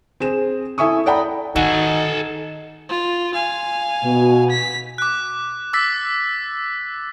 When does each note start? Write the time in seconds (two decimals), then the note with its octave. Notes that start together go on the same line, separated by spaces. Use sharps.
0.20 C4 G#4 E7
0.78 E4 A4 E5 G#5 C#6 D#6
1.06 A4 D5 F#5 G5 A#5 B5
1.56 D#3 D#4 F#4 A4 G#5
2.89 F4
3.34 F5 G#5
4.04 B2
4.50 B6
4.98 D6 F#6
5.73 D6 E6 A6 B6